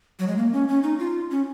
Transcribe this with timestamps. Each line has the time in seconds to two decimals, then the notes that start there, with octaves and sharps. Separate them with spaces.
0.19 F#3
0.28 G#3
0.37 A#3
0.53 C#4
0.69 C#4
0.83 D#4
0.99 F4
1.31 C#4